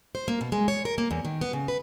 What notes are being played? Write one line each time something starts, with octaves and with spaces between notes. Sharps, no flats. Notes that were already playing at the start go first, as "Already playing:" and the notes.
C5
A#3
B2
G#3
C#5
A#4
A#3
E2
D#3
B3
C#3
B4